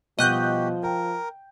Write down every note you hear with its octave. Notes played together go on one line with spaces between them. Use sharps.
B2 F3 G3 F#4 G4 D#5 F#6 G6
A#4 G5